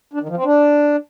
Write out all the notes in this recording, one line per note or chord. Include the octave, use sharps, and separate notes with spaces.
D4
D#3
F3
C4
D4